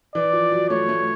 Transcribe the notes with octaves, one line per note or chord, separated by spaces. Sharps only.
E3 D5
F3
F#3
A3 C#5
A3